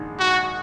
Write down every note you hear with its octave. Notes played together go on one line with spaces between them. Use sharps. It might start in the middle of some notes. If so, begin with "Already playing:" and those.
Already playing: A#1 G#2 D#3 G#3
F#4